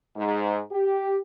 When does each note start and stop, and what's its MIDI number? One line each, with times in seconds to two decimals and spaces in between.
0.16 0.59 44
0.70 1.17 67